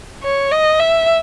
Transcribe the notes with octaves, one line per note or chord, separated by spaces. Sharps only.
C#5
D#5
E5